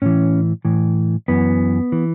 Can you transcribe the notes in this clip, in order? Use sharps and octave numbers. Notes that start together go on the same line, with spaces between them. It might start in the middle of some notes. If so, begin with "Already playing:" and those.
A2 E3 C#4
A2 E3
F#2 E3 B3
E3